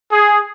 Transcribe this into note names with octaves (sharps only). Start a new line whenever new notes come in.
G#4